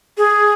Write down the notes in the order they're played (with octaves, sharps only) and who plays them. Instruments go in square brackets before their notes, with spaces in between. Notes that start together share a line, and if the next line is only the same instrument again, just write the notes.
[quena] G#4